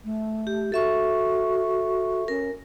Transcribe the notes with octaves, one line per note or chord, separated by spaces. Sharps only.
A3
G4
F#4 A4 E5 C#6
C#4 A#4